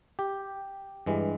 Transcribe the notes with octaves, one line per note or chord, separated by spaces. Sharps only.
G4
G2 E3 G#3